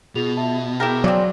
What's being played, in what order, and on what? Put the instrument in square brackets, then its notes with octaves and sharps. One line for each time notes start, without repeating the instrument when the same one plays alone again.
[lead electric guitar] B2 [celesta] F4 G#4 F7
[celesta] E5 A5
[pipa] E4 G4 A#4 [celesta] G#4 G6
[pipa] C#3 C4 [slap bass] F#3 [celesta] D5 G#5 D6